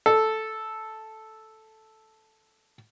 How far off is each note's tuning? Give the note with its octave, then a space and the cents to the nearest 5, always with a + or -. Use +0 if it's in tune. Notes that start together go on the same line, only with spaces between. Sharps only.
A4 -5